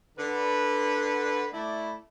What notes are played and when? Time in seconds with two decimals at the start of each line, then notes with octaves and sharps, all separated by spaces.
0.17 D3 B4
1.52 A3 E4 D5